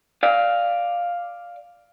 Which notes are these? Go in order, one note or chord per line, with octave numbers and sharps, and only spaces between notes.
D5 F5